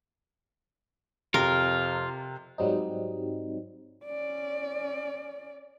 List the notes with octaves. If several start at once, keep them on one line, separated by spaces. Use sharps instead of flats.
F2 C3 F4 A#4
G#2 F#3 G3 C4 D#4
C#4 D5